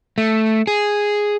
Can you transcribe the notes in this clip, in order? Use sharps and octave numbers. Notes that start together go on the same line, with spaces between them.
A3
G#4